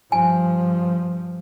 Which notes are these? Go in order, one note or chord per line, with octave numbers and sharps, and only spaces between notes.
G2 F3 G#5